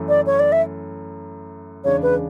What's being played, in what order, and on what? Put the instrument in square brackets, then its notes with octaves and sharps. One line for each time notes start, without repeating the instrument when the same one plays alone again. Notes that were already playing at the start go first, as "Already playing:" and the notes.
Already playing: [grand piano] F#2 E3 A3
[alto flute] D5
C#5
D5
E5
[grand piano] E2 C#3 G#3 D4 [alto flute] C#5
[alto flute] B4